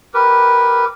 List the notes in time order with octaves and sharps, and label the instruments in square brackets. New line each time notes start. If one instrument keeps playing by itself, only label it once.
[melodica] G4 A#4 B4